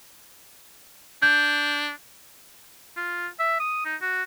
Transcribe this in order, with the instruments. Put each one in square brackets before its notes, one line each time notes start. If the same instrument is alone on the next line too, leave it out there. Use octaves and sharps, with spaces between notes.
[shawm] D4 [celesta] G6
[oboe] F4
E5
D#6
D#4
F#4